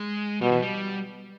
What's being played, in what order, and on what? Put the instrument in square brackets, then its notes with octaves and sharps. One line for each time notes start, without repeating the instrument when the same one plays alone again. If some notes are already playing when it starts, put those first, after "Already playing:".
Already playing: [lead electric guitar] G#3
[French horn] B2 [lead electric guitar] G3
[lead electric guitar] E3
G3